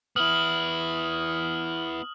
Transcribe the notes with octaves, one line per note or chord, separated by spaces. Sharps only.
B3 E4 D#6 F6 F#7